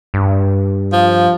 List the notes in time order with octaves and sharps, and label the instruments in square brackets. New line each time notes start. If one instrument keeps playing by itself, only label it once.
[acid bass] G2
[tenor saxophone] F3